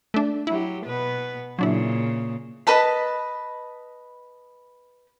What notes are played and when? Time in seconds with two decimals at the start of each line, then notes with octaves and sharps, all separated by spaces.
0.14 A3 D4
0.47 F#3 E4 G4
0.84 B2 B3 B4
1.59 A#2 C#3 F#3 D4 E4
2.67 B4 D#5 A5 B5